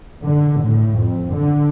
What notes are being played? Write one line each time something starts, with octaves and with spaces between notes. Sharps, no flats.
D3
A2
F2
D3